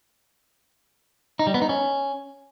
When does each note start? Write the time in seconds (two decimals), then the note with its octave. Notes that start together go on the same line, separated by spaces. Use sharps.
1.39 D#4
1.47 G3
1.54 B3
1.62 D#4
1.69 C#4